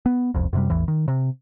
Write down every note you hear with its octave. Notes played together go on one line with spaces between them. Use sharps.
B3
D#1 C2 F2
F#2 C3 G3
A1 E2 E3
D#3
C3